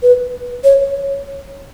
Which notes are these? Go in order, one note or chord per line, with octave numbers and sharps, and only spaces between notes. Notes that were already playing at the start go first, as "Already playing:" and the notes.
B4
C#5